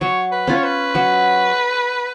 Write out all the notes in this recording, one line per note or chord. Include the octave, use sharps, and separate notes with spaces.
F#3 C#5
B4
C#4 F4
C#5
B4
F#3